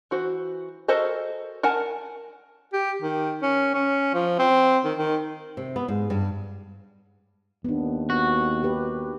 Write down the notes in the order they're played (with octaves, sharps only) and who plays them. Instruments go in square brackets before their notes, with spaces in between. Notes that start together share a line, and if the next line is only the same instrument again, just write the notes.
[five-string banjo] E3 F#4 C5
F#4 A4 A#4 C5 D#5
A#4 F#5 G#5 A5
[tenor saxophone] G4
D#3
C#4
C#4
F3
C4
D#3
D#3
[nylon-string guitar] C3
B3
G#2
G2
[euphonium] D#2 [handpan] B3 D4
[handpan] B3 [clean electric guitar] F#4
[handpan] D#4 G4 B4